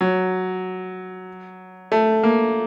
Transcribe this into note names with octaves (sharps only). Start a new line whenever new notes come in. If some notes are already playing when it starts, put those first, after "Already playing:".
F#3
A3
A#3